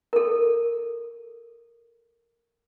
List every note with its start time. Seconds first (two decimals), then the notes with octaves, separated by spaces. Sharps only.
0.13 A4 A#4